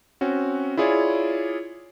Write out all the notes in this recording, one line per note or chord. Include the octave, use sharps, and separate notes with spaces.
C4 C#4 F#4
E4 F4 G#4 C#5 D5